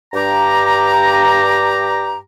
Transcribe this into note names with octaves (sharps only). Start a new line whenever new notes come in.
G2 G4 A#5